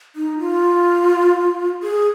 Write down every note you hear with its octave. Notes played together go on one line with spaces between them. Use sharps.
D#4
F4
G#4